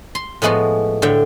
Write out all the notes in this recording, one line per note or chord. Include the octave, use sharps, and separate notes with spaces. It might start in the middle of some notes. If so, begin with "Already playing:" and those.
C6
A2 F3 G#3 B3 F#4
A2 D3 E5 G5